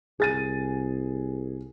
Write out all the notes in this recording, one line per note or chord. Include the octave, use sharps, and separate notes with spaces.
C2 G#4 A6 D#7